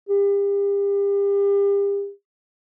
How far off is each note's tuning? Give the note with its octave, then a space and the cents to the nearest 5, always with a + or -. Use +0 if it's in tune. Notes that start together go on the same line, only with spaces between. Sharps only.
G4 +35